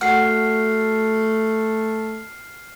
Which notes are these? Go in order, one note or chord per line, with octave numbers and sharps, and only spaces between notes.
A3 F#4 F#5 F6 C7